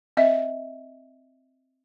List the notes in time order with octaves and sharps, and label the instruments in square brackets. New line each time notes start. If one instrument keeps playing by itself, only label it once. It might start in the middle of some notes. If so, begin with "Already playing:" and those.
[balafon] C4 D#5 E5